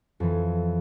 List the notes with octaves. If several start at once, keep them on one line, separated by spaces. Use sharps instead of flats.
F2 E3